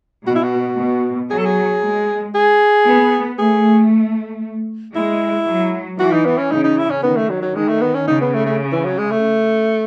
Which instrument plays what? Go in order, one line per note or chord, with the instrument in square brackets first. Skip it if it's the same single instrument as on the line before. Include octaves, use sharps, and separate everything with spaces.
[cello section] B2 [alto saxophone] F#4
[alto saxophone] E4
F#4
[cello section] B2
[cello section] F#3 [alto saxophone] G#4
[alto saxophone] A4
G#4
[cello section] G#3
[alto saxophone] G#4
[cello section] B3
[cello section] A3 [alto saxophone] G#4
[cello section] G#3 [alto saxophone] E4
[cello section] F#3
[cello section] E3 [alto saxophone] F#4
[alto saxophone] D#4
B3
C#4
[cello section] C#3 [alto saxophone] D#4
[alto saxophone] D#4
E4
C#4
[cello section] D#3 [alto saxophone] B3
[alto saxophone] A3
F#3
F#3
[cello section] D#3 [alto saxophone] G#3
[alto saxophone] A3
B3
C#4
[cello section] C#3 [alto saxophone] D#4
[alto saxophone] B3
A3
A3
E3
F#3
G#3
A3